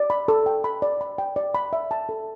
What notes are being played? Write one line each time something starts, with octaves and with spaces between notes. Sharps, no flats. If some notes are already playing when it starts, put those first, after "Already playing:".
Already playing: D5
B5
A4
G5
B5
D5
B5
G5
D5
B5
E5
A5
A4